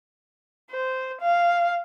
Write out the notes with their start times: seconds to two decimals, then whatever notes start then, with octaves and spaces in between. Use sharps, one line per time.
0.71 C5
1.21 F5